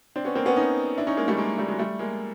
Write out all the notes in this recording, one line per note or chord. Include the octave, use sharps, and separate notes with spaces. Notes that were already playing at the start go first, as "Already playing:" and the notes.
C4 D4
B3 C#4
A#3 C4
B3 C#4
C#4 D#4
D4 E4
C#4 D#4
G#3 A#3
G3 A3
G#3 A#3
G3 A3
F#3 G#3
G3 A3
G#3 A#3